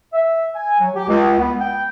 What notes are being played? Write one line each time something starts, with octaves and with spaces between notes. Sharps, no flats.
E5
G#5
F#3
G4
C#2
B3
G5